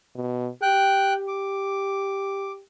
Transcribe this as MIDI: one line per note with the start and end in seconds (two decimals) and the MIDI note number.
0.16 0.49 47
0.62 2.62 67
0.62 1.13 79
0.62 1.13 90
1.28 2.52 86